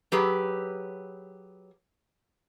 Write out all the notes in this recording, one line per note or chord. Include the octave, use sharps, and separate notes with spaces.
F#3 G4 G#4 B4